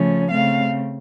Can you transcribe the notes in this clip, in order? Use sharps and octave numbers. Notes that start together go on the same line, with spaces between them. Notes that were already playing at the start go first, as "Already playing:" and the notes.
Already playing: C#3 F3 A3 C#4
C#3 A3 C4 F5